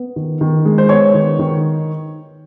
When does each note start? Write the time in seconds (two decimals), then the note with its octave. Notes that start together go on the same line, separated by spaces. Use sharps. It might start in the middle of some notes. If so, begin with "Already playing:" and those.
Already playing: B3
0.16 D#3
0.41 D#3
0.65 G#3
0.78 C5
0.89 B3 C#5
1.14 D#3
1.39 D#3